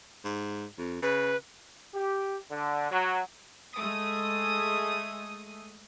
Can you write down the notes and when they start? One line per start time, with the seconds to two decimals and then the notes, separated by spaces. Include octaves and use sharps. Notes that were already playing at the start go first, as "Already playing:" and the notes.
0.25 G#2
0.78 F2
1.03 C#3 B4
1.94 G4
2.51 D3
2.91 F#3
3.76 G#3 A3 D#6